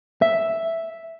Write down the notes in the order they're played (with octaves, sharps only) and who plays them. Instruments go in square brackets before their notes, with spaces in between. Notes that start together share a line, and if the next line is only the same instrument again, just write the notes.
[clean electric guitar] E5